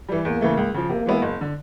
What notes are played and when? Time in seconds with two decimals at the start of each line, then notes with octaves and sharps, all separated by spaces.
0.09 E3 G3
0.25 E2 A#3
0.41 C#3 E3 A3
0.57 C#2
0.74 C#3 F3
0.89 C3 A#3
1.06 E3 G#3 B3 E4
1.22 F#1
1.41 D3